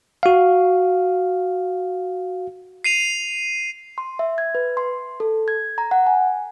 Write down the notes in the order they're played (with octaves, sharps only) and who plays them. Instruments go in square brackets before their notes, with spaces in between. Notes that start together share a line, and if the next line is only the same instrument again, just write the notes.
[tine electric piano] F#4 F5
[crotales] C7 D#7 F7
[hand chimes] C6
E5
G#6
B4
C6
A4
G#6
A#5
F#5
G#5